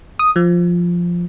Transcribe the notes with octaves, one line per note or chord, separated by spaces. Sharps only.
D#6
F3